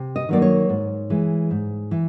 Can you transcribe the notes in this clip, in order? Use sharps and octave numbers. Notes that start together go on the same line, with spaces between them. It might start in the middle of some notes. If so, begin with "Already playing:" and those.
Already playing: C3
D#5
D#3 F#3 A#3 D5
C#5
G#2
E3 G#3
G#2
E3